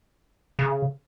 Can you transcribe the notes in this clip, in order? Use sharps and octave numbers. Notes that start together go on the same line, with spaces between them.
C#3